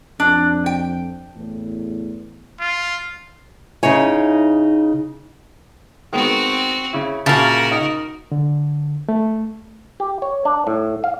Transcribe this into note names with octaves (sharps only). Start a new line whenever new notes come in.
F2 D4
G5
E2 A2
F4
C#3 D#4 E4 C#5 G#5
D#3 G#3 B3 C4 F#4
C#3 E4
A#2 C#3 F4 F#4 A#4 E5 A5
D#4
D3
A3
G4
C#5
D4
A2
F5